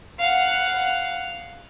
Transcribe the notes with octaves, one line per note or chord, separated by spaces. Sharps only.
F5 F#5